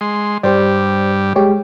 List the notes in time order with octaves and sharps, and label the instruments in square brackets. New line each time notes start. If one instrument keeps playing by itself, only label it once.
[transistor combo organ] G#3 C6
[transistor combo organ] G2 G3 [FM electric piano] G4 C5 D5
[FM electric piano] G#3 G4 C#5